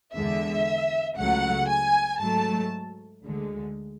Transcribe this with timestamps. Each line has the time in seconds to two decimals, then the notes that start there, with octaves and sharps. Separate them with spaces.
0.13 E2 D3 G#3 E5
1.17 C#2 C#3 F#3 A3 F#5
1.68 G#5
2.20 G#2 F#3 A3 A5
3.23 D2 D3 G#3